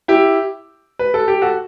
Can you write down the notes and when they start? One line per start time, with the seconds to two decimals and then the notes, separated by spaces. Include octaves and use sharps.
0.08 E4 G4
0.99 B4
1.14 A4
1.28 G4
1.42 F#4 A4